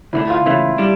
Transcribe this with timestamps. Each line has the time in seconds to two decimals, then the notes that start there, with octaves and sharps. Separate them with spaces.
0.13 D2 D3 A3 E4
0.30 F4
0.46 C#2 C#3 E3 A3 E4
0.78 G3 D4